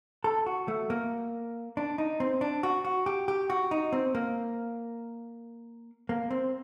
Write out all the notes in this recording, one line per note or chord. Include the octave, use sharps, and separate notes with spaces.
A4
F#4
A3
A#3
D4
D#4
C4
D4
F#4
F#4
G4
G4
F#4
D#4
C4
A#3
A#3
C4